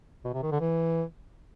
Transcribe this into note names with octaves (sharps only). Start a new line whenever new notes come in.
B2
C3
D#3
D3
E3